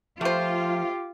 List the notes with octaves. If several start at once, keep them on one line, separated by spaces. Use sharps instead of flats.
F3 A3 F4 G4 C5